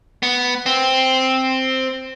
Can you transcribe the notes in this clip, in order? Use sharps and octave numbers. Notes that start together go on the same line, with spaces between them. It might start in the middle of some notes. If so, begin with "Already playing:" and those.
B3
C4